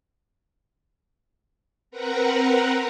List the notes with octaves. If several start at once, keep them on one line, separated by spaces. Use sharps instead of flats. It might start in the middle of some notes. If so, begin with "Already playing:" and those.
C4 A#4 B4 F#5 A#5